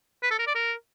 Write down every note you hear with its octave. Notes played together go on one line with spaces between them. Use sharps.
B4
A4
A#4
D5
A#4